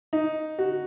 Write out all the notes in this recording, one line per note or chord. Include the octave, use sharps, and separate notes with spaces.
D#4
F#4